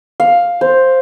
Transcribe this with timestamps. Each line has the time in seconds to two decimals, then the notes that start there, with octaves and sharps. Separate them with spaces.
0.20 F5
0.61 C5